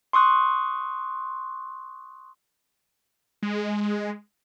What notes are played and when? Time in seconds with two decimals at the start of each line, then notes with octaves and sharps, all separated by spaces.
0.13 C6 C#6 D#6 F#6
3.43 G#3